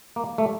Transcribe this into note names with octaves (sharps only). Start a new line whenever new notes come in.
A#3
A3